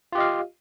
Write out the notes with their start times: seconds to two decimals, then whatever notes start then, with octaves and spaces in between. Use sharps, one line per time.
0.12 F4
0.15 G4
0.18 D#5
0.20 F5